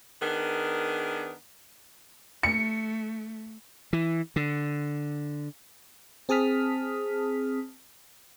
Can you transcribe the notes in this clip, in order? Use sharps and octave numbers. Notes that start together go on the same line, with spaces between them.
D#3 B3 D4 G#4 A#4
A3 C#7
E3
D3
C4 G#4 A5 D#6 F6 B6